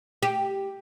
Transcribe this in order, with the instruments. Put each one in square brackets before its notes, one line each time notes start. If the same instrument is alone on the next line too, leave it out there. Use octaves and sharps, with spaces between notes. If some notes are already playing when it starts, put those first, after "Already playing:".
[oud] G4